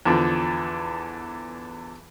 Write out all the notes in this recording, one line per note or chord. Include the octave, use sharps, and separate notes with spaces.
E2 D3 F3